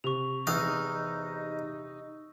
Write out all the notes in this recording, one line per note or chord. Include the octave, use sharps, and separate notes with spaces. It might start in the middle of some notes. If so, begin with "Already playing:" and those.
C3 C#6 F7
E2 D#4 F5 D#6 E6